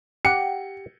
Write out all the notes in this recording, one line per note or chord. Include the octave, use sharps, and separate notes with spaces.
G4 F#5 C#7